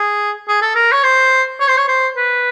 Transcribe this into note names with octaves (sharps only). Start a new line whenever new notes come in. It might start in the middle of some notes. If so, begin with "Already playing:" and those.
Already playing: G#4
G#4
A4
A#4
C#5
C5
C#5
C5
C#5
C5
B4